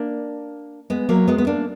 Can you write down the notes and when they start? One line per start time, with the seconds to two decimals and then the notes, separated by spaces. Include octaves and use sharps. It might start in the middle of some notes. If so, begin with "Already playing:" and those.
Already playing: A#3 D4
0.90 G#3 B3
1.09 F#3 A#3
1.27 G#3 B3
1.38 B3
1.47 A#3 D4